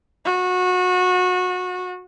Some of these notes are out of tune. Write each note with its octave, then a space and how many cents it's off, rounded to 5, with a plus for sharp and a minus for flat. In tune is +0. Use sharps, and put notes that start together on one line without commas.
F#4 -25